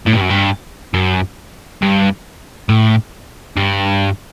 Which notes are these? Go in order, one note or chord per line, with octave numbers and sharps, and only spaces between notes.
A2
G2
F#2
G2
F#2
G2
A2
G2